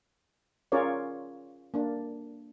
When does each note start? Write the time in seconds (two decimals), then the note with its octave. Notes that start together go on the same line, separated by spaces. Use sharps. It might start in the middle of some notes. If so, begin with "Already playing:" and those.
0.72 C#4 F4 G#4 A#4 C#5 D5
1.74 A#3 D4